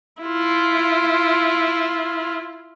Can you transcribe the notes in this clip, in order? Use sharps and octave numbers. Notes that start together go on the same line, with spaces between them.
E4 F4